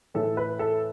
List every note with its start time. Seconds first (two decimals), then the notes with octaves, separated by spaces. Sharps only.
0.14 A2 E3 A3 A4
0.37 B4
0.59 A4